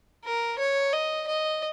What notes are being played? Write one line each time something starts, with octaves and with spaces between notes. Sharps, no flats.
A#4
C#5
D#5
D#5